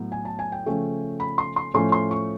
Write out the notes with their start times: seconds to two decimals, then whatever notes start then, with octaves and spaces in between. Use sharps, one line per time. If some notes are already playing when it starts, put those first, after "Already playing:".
Already playing: A2 F#3 B3
0.12 G#5
0.25 A5
0.39 G#5
0.52 G5
0.66 C#3 F3 A3 C#4
1.20 B5
1.38 C6
1.56 C6
1.74 A2 F3 A3 C#4 C6
1.92 C6
2.11 C#6